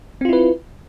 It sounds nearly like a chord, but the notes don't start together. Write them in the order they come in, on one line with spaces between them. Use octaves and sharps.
C4 F4 E4 B4